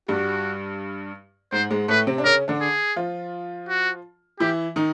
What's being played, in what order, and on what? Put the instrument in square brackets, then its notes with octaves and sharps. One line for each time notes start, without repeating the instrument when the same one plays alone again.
[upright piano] G2 G3 [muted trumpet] F#4
[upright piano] G#2 G#3 [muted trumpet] C5
[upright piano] G#2 G#3
[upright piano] A2 A3 [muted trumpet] B4
[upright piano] C3 C4
D4
[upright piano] C#3 C#4 [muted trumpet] A#4
[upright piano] D3 D4
[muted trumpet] G#4
[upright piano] F3 F4
[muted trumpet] F#4
[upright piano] E3 E4 [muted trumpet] G4
[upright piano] D#3 D#4